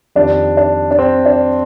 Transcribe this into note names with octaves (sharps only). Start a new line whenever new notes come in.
F2 D#3 G3 D4
D4
D4
C4
D4